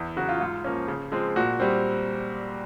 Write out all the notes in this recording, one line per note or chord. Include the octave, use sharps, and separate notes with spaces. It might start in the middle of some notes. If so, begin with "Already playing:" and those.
Already playing: E2
C#3 F#3 F#4
F4
G#2 F4
F3 A#3 C#4
C#3
F3 G#3 C4
A#2 F#4
G3 C4